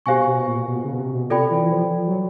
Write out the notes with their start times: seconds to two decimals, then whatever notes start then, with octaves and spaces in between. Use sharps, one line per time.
0.06 B2 G4 C5 F5 G#5 C#6
0.27 B2
0.47 A#2
0.68 B2
0.84 C#3
0.93 B2
1.00 C3
1.14 B2
1.30 C3 F4 A4 D5 G5 B5
1.51 E3
1.65 E3
1.72 F3
2.07 F#3